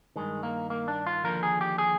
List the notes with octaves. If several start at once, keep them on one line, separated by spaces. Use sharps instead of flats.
G2 D#3 G#3
A#3
A#3
D4
F4
D#2 D3 F3 A#4
G#4
G4
G#4